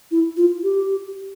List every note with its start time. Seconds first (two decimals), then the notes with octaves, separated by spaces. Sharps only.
0.11 E4
0.37 F4
0.63 G4